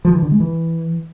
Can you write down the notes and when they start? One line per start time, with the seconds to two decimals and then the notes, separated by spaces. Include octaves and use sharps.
0.05 F3
0.14 E3
0.22 D3
0.31 G#3
0.40 E3